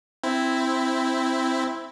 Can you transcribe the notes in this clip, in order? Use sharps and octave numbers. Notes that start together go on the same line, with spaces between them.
C4 E4